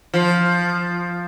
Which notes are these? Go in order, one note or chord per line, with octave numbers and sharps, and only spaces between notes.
F3